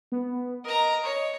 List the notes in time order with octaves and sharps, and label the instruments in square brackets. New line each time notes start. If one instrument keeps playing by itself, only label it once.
[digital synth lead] B3
[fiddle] A#4 A#5 [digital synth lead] D#5
[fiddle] C#5